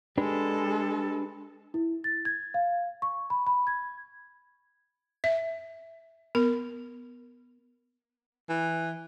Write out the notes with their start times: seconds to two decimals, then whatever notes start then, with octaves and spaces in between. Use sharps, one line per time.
0.18 G#3 D4 G4 A4 B4
1.74 E4
2.04 A6
2.25 G#6
2.54 F5
3.02 C#6
3.30 B5
3.47 B5
3.67 G#6
5.24 E5
6.35 B3 A#4
8.49 E3